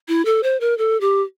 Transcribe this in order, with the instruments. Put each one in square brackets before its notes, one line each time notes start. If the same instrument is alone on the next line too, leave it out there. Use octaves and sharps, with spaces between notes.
[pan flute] E4
A4
C5
A#4
A4
G4